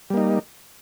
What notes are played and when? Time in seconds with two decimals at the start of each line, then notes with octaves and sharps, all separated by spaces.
0.10 G3
0.14 A#3
0.17 D#4